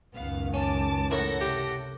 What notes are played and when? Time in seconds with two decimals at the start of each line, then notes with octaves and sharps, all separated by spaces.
0.14 C#2 F#2 D#3 B3 F5
0.54 C#4 A5 D6
1.11 A2 E4 A4 A#4 C#5 F#5 A#6
1.41 C3 G4